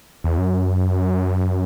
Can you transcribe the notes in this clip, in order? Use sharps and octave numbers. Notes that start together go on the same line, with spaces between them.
E2
F#2